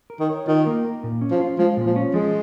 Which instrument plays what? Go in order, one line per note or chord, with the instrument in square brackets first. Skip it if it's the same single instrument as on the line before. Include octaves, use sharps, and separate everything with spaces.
[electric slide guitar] A#4
[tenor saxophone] D#3
[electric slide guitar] C#5
[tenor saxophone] D#3 [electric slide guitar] F4
[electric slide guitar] A#3
A#4
A#2
C#4
[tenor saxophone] F3
[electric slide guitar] F4
[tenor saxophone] F3 [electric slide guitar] G#3
[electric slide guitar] A#2
[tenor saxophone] F3
[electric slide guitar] C#4
[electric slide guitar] F3 [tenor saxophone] G#3